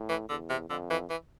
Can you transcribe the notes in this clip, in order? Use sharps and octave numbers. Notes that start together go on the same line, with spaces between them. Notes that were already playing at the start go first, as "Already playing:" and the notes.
Already playing: A2
E3
E2 D3
C3
F2 D3
E3
E3